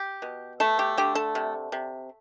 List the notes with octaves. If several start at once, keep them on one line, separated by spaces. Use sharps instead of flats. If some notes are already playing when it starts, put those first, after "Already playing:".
Already playing: G4
B2
A3 A4
G4
D3 G4
A4
C3
C3